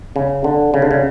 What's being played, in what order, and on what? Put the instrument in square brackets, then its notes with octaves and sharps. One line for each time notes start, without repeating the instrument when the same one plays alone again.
[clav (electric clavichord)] C#3
D3
C#3
D3
C#3